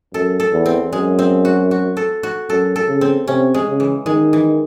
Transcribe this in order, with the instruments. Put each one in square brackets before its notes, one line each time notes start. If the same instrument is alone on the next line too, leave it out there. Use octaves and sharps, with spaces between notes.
[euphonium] F#2 [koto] A4
[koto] A4
[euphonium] E2
[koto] C4
[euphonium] F#2 [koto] G#3
[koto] C4
F#4
F#4
A4
F#4
[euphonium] F#2 [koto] A4
[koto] A4
[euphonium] C#3
[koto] C4
[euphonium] C3 [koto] C#4
[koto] G#3
[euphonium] C#3
[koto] E3
[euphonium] D#3 [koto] G#3
[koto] E3